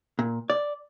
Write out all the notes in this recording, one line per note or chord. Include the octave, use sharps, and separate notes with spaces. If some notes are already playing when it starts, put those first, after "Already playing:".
A#2
D5